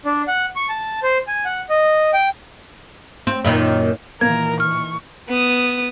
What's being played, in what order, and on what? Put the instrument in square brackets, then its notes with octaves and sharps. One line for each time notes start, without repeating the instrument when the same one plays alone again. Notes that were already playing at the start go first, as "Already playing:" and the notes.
[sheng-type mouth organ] D4
F#5
C#6
A5
C5
G#5
F#5
D#5
G5
[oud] C4
F#2 A#2 D#3
[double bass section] A#2 D#3 E3 [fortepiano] A#3 [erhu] A#4 [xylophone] G#6
[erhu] C#6 [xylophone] F6
[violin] B3 D#6